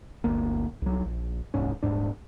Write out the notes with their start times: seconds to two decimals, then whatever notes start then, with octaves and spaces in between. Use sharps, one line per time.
0.24 G1 D2 A#3
0.82 C2 F#3
1.06 A#1
1.54 D#1 C2 G#2 C#4
1.83 D#1 A#1 G#2 D4